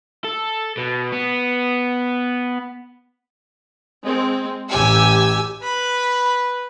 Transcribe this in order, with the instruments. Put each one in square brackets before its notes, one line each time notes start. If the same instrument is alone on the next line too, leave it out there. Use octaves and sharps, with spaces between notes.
[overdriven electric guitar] A4
B2
B3
[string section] G#3 C4
A1 G4 G#5 E6
[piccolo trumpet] B4 [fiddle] B5